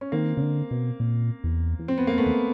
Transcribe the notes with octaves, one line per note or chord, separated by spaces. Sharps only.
C#4
D#3 A#3 C4
C#3
D3
B2
A#2
E2
E2
F2 C4
B3
A#3
A3 B3
E2